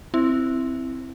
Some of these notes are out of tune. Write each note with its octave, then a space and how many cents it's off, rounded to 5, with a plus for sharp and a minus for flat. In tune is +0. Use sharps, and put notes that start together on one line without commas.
C4 +0 E4 +0